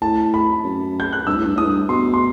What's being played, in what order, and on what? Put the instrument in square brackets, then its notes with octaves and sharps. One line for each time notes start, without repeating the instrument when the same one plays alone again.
[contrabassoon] A2 [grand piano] A5
[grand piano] B5
[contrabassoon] F#2
[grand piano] G6
F#6
[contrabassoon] G2 [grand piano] E6
[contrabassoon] A2
G2
[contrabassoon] A2 [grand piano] D#6
[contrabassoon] G2
[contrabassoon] B2 [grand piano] C6
[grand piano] C6